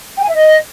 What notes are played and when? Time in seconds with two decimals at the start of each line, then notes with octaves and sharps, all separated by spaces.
0.17 G5
0.23 G#5
0.29 E5
0.35 D#5